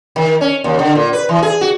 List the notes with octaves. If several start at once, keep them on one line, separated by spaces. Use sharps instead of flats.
D#3
C#4
D#2
D3
A#2
B4
E3
G#4
F#4